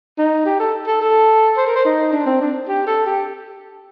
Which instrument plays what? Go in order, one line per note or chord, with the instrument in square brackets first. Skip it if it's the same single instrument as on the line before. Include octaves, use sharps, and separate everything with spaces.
[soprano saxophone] D#4
G4
A4
A4
A4
C5
A#4
C5
D#4
D4
C4
D4
G4
A4
G4